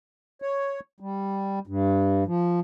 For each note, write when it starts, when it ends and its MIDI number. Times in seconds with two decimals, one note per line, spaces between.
0.42 0.80 73
1.00 1.59 55
1.67 2.24 43
2.26 2.60 53